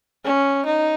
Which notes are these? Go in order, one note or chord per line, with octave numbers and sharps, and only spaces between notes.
C#4
D#4